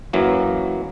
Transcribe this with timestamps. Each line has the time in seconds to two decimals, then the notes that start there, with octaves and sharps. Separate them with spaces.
0.13 F#2 E3 F#3 A#3